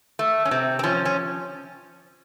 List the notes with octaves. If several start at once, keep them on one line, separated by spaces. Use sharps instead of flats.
A3
C#4
C3 C4
C4
F3 C#4
C#4